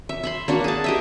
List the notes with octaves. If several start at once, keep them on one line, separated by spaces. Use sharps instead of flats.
E5
E5 B5 C6
A#3 D4 F#4
G#4 A5
G4 D#5 E5